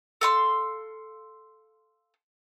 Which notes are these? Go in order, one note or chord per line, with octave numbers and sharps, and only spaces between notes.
A4 F5 C6 E6